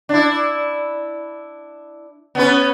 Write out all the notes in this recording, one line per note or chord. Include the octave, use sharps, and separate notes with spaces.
D4 E4
B3 C#4 B4